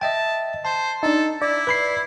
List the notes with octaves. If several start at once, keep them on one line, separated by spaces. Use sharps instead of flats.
D#5 E5 G5 A5
C5 A5
D4 D#4 A4
E4 D5
B4 B5 C7